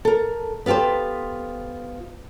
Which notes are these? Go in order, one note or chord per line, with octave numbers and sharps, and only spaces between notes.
A4 A#4
B3 F4 G4 A4 C5